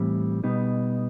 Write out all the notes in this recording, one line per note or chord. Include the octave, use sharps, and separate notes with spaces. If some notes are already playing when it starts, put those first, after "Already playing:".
Already playing: A2 E3 G3 C4
B2 G3 B3 D#4